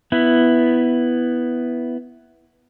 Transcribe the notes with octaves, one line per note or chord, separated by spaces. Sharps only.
B3 E4